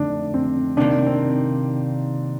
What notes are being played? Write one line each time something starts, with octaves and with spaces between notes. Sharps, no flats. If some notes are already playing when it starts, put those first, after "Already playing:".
Already playing: F2 D3 A3 D4 D#4
C4
C3 D#3 A#3 D4
C4